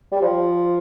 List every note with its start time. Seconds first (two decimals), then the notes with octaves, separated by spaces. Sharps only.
0.12 G3
0.22 F3